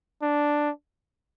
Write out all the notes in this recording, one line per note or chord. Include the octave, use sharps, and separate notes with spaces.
D4